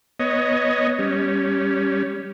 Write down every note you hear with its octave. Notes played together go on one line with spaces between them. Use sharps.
B3 C#5 D#5
G3 C#4